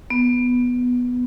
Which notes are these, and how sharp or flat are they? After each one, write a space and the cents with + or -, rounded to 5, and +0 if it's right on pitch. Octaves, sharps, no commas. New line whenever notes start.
B3 +0